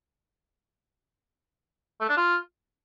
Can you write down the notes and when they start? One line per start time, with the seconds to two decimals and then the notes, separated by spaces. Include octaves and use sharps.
2.01 A3
2.09 D4
2.17 F4